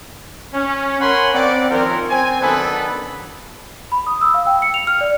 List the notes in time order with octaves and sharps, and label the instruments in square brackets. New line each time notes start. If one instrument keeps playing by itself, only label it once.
[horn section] C#4
A#4 C#5 F#5 G#5 B5 C6
C4 D5 F#5
D#3 F3 C4 C#4 A#4
C4 G#5
F#2 D#3 B3 D4 A4 B5
[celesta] B5
D#6
E6
F5
G5
C#7
F7
F6
D5